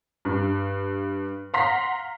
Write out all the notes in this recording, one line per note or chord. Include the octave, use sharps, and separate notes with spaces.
G2
F5 F#5 A#5 C6 A#6 B6